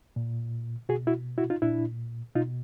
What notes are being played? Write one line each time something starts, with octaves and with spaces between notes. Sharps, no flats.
A#2
B2 F#4 G#4
E4 F#4
E4 F#4
D#4 F4
A#2 D4 E4
B2 D#4 F4